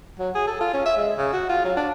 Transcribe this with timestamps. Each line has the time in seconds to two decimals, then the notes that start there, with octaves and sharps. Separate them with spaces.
0.19 F#3
0.35 G#4
0.48 A4
0.61 F4
0.74 C#4
0.86 E5
0.97 G#3
1.18 C#3
1.33 F#4
1.49 F4
1.65 F#3
1.77 D4